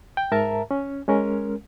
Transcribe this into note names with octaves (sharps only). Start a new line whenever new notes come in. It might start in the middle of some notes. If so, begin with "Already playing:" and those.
G5
G#2 A#4 E5 A5 A#5
C#4
G#3 C#4 A#4